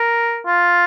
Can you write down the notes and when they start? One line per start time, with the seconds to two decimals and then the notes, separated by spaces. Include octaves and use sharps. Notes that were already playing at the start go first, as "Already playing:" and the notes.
Already playing: A#4
0.46 F4